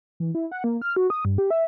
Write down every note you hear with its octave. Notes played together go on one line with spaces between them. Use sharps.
E3
E4
F#5
A#3
F6
F#4
D#6
G2
G4
E5